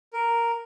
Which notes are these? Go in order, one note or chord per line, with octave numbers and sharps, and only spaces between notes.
A#4